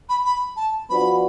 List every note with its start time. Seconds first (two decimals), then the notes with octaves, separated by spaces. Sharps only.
0.09 B5
0.25 B5
0.57 A5
0.89 F3 B3 D4 F#4 B5